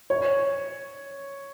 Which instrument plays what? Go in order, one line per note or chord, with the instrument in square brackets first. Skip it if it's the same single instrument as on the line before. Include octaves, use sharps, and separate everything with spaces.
[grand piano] C#5